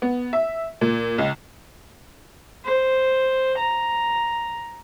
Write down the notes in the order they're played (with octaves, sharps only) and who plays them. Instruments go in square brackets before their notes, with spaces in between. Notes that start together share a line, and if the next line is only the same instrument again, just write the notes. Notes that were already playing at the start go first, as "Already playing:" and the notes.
[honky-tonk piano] B3
E5
A#2
C#2
[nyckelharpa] C5
A#5